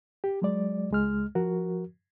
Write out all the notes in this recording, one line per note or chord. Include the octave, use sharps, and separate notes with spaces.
G4
F#3 G#3 D5
C#2 G#3 F6
F3 F#4 A#4